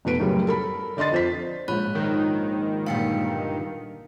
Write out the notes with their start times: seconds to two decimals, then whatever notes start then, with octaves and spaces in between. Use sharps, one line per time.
0.05 F1 B2 B4 D7
0.20 F#2 A2 C#3 F#3 G3
0.47 A4 A#4 B5
0.97 D3 D5 D#5 C6 A6
1.12 F2 C5 B6
1.68 A#1 G#2 C#5 B5 F#6
1.95 D#3
2.86 G2 A#2 D3 F5 C#7